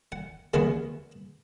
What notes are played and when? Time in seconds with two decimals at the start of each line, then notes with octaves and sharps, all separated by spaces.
0.12 F#5
0.54 D#2 C#3 E3 G#3 B3 F5